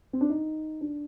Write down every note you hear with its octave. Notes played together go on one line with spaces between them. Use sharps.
C4
D4
D#4
D4